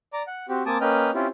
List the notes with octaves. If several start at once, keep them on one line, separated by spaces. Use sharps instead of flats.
D5 A#5 D6
F#5
C4 F#4 G4
A#3 C4 G#5 A5 D6 D#6
A#3 C#4 B4 D#5 G5 F6
C4 C#4 E4 F4 G4